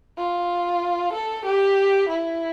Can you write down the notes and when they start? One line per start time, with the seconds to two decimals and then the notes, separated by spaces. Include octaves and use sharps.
0.18 F4
1.13 A4
1.45 G4
2.09 E4